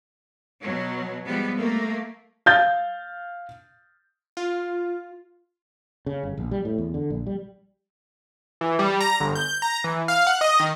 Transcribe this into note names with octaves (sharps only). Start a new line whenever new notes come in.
B2 F#3
F3 G3 G#3 B3
A3 A#3
F5 G6 A6
F4
C#3
G1
A#1
G3
A2
E2
D3
A#1
G3
E3
G3
A#5
G1
G6
A#5
E3
F5
F#5
D#5
D#3